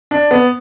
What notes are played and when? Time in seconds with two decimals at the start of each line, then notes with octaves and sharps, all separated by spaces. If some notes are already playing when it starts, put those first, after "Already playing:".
0.11 D4
0.31 B3